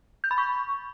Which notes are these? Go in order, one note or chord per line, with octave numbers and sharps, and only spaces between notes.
G6
B5
C#6